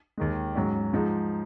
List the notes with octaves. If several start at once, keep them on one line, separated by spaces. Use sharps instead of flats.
D#2 D#3 G#3
G#2 F#3 C#4
G#2 F3 G#3 D#4